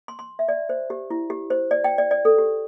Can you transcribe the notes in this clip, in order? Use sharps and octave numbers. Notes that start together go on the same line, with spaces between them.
C6
C6
E5
D5
C5
G4
E4
G4
C5
D5
G5
D5
D5
A4
G4